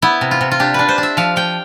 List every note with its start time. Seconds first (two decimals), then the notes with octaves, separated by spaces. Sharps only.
0.02 B3 E4
0.21 C3
0.31 F4
0.41 C3
0.51 F4
0.60 D4 G4
0.74 D4 B4
0.89 C5
0.98 D4
1.03 E5
1.17 F3 F5
1.36 F3 G5